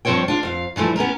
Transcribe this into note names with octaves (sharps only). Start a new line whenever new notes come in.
G2 F3 C4 C5 C#5 G5
D4 F4
F2 F5
G2 E3 F3 A3
B3 C#4 E4 A#4